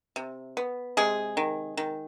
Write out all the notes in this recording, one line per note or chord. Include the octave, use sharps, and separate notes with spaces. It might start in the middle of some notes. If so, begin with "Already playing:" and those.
C3
B3
C3 G#3 G#4
D#3
D#3